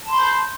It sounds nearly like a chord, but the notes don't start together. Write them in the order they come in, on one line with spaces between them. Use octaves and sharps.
A5 C6 B5 G6